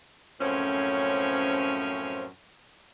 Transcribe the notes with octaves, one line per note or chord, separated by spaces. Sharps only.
F#2 A2 F3 C4 C#4 C#5